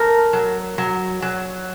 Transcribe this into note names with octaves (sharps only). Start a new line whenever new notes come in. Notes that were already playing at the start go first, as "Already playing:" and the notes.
Already playing: A3 A#4
F#3
F#3
F#3